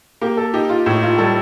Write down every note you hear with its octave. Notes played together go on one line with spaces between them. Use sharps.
A#3 G4
A4
D#4 G4
F4
A2 D#4
F4
G3 A4